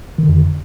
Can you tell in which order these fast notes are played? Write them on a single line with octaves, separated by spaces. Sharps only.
D#3 D3 F2